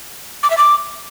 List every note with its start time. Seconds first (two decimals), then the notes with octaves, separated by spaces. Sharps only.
0.43 D6
0.50 E5
0.57 D6